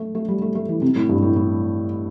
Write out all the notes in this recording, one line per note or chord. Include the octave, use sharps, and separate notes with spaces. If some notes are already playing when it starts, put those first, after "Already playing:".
Already playing: A3
A3
G3
A3
A3
E3
C3
A2
G2
A2
A2